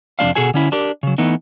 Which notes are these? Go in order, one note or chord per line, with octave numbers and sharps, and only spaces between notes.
F2 C3 G#3 D4 F5
B2 F#4 G#4 A4 G#5
D3 C#4 E4
D4 G4 A#4
C#3 F#3
E3 A3 B3 D#4